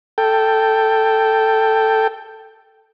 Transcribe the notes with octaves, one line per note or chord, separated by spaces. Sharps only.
A4 G5